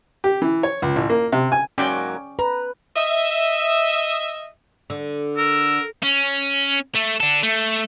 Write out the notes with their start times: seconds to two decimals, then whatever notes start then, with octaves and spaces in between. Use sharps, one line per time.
0.24 G4
0.42 E3
0.63 C#5
0.82 C#2
0.96 A1
1.10 A#3
1.32 C3
1.52 G#5
1.78 G#2 F#3 A#3 C#4 D5 G5
2.39 B4 A#5
2.96 D#5 E5
4.90 D3
5.37 A#4 E6
6.03 C#4
6.95 A3
7.20 D4 A4
7.43 A3